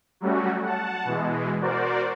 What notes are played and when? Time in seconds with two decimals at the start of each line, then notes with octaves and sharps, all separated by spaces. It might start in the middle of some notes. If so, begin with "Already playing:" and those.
0.20 F#3 G3 A3 C#4 F#4
0.63 F#5 A5
1.05 B2 E3 G#3
1.61 F#4 A#4 C5 D5